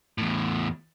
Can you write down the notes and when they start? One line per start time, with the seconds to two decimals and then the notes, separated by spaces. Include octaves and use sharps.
0.18 E2 A2